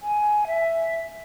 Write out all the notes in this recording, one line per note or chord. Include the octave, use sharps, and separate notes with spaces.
G#5
E5